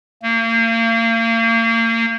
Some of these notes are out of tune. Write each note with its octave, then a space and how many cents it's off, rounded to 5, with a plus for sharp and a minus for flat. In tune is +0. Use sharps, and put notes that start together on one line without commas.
A#3 -35